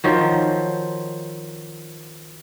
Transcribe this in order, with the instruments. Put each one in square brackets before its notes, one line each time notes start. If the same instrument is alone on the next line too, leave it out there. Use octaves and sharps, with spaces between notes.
[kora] D#3 F3 F#3